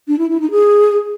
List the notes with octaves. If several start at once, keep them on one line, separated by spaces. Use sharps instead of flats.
D4
E4
E4
D#4
G#4